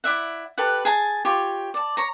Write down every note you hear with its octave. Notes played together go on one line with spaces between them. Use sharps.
E4 D5 E5 F#5
G4 A4 B4 F#5
G#4 G#5 A5
F4 G4 C#5
D5 A5
C#5 A#5